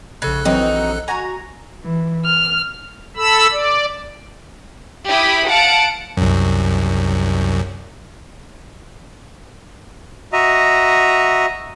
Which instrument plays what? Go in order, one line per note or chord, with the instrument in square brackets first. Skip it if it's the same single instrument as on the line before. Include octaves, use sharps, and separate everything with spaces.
[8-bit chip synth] A#1 A4 F#6 [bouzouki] C#3
[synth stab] E3 F#3 C4 [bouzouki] D#4 F#4
[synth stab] F#4 A#5 [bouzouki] G#5
[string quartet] E3
F6
[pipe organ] A4 B5 E6
D5
[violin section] E4 G4 B5 D#6
F5 F#5 A5 D7
[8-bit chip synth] C2 F#2
[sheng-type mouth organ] F#4 D#5 E5 A#5